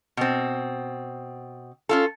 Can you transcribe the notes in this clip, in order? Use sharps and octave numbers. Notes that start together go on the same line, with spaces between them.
B2 C4
C#4 F4 A4